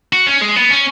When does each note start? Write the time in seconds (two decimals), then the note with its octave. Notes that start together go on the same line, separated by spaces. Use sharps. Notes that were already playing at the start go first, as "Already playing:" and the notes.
0.13 F#4
0.27 C#4
0.41 G#3
0.56 B3
0.70 C#4